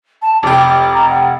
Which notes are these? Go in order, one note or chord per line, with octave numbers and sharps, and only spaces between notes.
A5
F1 G5 D6
D6
A#5
F#5